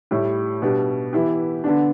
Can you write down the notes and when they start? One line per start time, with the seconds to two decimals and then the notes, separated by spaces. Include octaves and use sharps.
0.11 A2 G3 E4 G4
0.62 B2 G3 D4 G4
1.13 E3 B3 E4 G4
1.64 D3 B3 D4